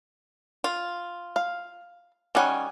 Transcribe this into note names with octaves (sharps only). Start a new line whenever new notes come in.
F4
F5
D#3 G3 C#4 F#5 G#5